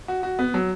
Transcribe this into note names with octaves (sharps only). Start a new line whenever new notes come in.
F#4
F#4
B3
F#3